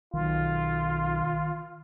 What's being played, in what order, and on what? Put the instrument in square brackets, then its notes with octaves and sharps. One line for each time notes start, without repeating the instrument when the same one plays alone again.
[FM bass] B1 [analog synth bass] D#3 [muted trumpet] F4